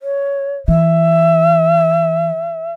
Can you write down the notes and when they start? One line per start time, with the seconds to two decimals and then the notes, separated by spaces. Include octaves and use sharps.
0.01 C#5
0.68 E3 E5